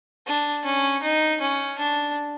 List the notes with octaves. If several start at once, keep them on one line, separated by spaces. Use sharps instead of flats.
D4
C#4
D#4
C#4
D4